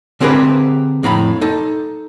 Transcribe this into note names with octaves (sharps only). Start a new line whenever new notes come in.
D3 C4 G4 G#4 A#4 B4
F2 A2 A#5 B5
D#4 A4